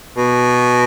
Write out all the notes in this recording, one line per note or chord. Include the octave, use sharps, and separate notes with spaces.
B2